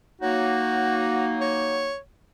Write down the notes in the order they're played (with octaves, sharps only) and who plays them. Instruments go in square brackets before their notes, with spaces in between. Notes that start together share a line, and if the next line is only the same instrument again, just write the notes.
[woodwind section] F#3 A#3 D#4 [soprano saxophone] F#4
[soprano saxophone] C#5